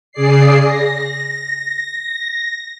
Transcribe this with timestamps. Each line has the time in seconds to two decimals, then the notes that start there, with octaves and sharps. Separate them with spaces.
0.12 C#3 G#4 D5 C7
0.63 A#6